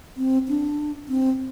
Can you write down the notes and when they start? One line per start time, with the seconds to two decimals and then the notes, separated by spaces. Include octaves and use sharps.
0.17 C4
0.49 D4
1.09 C4